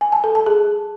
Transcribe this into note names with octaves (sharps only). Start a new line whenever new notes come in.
G#5
A5
A4
A5
G#4